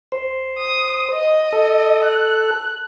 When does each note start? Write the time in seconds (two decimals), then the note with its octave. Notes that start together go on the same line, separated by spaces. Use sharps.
0.12 C5
0.58 D#6
1.13 D#5
1.52 A4
2.05 F#6